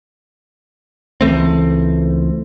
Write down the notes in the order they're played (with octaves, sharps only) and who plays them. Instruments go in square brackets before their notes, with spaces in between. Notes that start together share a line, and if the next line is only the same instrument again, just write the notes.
[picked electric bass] C#2 E3 A3 C4